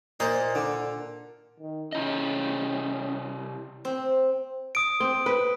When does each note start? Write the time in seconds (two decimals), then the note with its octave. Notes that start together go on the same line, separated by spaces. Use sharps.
0.20 A#2 C5 D#5
0.55 D3
1.60 D#3
1.92 C3 C#4 E4 D#5
3.85 C4
4.75 D#6 D7
5.00 C4
5.26 B4